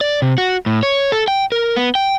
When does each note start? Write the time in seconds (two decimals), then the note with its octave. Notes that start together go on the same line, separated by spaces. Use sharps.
0.01 D5
0.22 C3
0.38 F#4
0.66 A2
0.83 C#5
1.12 A4
1.28 G5
1.52 A#4
1.76 B3
1.95 G5